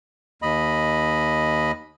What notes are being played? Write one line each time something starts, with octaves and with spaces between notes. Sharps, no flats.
D#2 D#5 B5